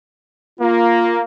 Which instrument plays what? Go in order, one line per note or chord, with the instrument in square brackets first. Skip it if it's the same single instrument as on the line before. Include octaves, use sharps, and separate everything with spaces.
[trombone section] A#3 [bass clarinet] F4